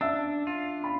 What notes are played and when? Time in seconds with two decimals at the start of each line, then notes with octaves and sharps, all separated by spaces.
0.01 D4 E5 E6
0.47 F4
0.84 B5